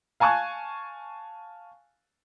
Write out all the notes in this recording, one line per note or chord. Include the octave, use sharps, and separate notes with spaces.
F5 G#5 A5 C#6 F#6 G#6